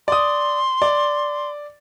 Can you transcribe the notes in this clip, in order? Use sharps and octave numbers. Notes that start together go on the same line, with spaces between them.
D5 C6 D#6
D5